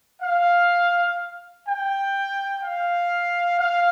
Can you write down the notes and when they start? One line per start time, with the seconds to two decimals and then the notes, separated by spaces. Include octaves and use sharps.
0.22 F5
1.68 G5
2.63 F5
3.59 F5